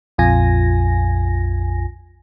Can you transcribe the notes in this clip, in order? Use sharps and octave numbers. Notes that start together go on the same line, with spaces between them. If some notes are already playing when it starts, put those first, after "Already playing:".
A#1 F2 F4 G#5 A#6